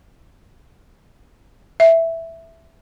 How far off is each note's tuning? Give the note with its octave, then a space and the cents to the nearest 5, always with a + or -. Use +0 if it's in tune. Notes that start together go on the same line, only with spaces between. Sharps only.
E5 +0